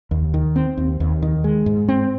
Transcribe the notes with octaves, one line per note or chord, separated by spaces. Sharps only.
D#2
D#3
C4
D#2
D#2
D#3
G#3
G#2
C4